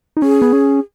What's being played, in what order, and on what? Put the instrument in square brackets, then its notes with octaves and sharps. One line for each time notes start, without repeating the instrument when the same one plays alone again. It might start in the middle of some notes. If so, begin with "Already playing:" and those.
[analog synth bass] D#4
[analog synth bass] C#4 [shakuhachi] G#4
[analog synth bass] B3
C#4